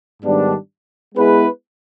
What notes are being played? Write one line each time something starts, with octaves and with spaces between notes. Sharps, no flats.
G#2 D#3 G3 B3 D4
G#3 B3 E4 G#4 B4